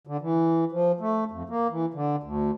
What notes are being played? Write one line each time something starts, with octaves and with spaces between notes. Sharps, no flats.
D3
E3
F3
A3
F2
A#3
E3
D3
D2